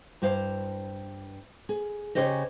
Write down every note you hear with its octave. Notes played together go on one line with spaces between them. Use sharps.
G2 E4 C5 F5
G#4
C#3 C#4 G4 C5 D#5